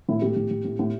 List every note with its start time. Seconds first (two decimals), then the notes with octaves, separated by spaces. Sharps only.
0.09 A2 E4
0.22 A2 G4
0.36 A2
0.51 A2
0.65 A2
0.79 A2